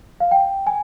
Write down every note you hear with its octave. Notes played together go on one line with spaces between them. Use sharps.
F5
G5
G#5